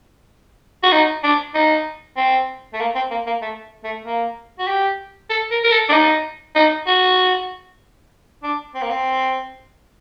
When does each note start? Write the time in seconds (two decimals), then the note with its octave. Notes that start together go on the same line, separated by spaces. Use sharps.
0.83 F#4
0.92 D#4
1.23 D4
1.55 D#4
2.17 C4
2.74 A3
2.80 A#3
2.95 C4
3.11 A#3
3.26 A#3
3.42 A3
3.84 A3
4.05 A#3
4.59 F#4
4.67 G4
5.30 A4
5.51 A#4
5.64 A#4
5.71 A4
5.89 D4
5.92 D#4
6.55 D#4
6.87 F#4
8.43 D4
8.75 C4
8.82 A#3
8.90 C4